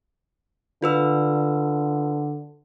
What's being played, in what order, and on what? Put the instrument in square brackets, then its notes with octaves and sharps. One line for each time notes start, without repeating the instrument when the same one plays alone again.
[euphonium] D3 [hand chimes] F4 B4 E6